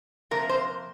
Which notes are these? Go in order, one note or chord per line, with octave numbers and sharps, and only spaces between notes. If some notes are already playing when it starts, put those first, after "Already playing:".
F2 C3 A#3 A#4
C5